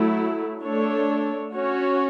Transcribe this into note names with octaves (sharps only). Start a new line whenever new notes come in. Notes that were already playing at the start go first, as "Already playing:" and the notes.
Already playing: F#3 A3 E4
A3 D4 A4 C#5
C#4 F#4 C#5